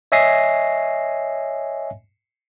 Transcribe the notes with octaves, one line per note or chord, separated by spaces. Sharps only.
C#5 D#5 E5 G#5 A#6 C7